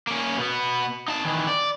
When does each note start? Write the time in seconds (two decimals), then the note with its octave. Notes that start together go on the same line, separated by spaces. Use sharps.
0.07 A#3 C#4
0.37 B2 B3
1.08 D#4 A5
1.25 D#3 E3
1.47 D5